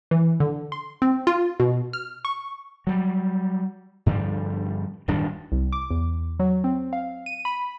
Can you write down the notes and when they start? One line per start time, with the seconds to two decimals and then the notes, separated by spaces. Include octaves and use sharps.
0.11 E3
0.40 D3
0.72 C6
1.02 C4
1.27 F4
1.60 B2
1.93 F6
2.25 C#6
2.87 F#3 G3
4.06 G2 D3 F3 G3
5.08 D1 G2 D#3 D4
5.52 C2
5.72 D6
5.91 E2
6.40 F#3
6.64 C4
6.93 F5
7.26 D#7
7.45 B5